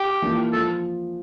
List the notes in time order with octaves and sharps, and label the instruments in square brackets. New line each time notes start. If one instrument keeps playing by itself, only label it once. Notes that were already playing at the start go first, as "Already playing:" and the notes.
Already playing: [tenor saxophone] G4
[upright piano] E3 A#3 D4 F4
[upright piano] F3 [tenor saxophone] A4